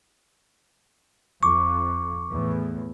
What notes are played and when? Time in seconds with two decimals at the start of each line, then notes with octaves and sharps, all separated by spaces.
1.43 F2 C#6 D6
2.30 E2 A2